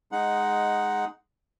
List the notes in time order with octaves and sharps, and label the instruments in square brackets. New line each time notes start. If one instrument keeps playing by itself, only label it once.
[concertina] G#3 D#4 F#5